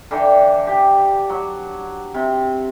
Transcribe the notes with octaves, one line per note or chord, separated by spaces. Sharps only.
D3 E3 G5
G4
F#3
C3